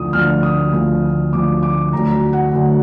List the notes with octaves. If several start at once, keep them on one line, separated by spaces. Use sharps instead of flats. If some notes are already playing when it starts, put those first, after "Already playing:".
Already playing: D2 D3 F3 D#6
D2 D3 F3 F6
D#6
D2 D3 F3
D2 D3 F3 D6
D6
D2 D3 F#3 A#5
F#5
D2 D3 F#3